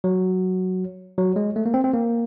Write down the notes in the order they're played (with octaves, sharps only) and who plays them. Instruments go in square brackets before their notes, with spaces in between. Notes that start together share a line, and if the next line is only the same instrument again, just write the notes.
[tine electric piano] F#3
F#3
G#3
A3
A#3
C4
C4
A#3